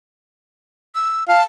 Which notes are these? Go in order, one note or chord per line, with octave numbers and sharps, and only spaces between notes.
E6
F5 A5